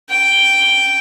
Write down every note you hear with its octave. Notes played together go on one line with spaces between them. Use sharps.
G5